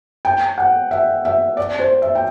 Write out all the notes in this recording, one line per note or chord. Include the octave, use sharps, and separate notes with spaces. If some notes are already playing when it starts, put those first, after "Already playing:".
G5
F#5
E5
E5
D5
C5
E5
G5